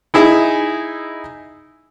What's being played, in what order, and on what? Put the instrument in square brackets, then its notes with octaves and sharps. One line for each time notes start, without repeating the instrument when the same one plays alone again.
[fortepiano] D#4 E4 G#4 E5